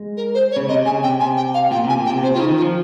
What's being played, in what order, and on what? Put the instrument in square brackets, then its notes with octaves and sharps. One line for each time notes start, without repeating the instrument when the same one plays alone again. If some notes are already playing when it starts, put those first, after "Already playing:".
Already playing: [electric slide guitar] G#3
[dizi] A#4
C5
C#5
[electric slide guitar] C#3
[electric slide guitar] C3 [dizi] D#5
[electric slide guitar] C#3 [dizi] G#5
[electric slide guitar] C3 [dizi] G5
[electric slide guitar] C3 [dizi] G#5
[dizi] G5
F5
[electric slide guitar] A#2 [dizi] G5
[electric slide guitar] C3 [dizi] G#5
[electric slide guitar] A#2
[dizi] G5
[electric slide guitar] C3
[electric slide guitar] C3 [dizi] C5
[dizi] F4
[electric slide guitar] C#3 [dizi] D#4
[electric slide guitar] D#3
[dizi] F4
[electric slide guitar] F3